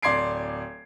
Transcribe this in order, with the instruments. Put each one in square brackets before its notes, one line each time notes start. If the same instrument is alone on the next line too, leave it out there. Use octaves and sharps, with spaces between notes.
[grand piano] D1 D5 C6 G#6 C7 D7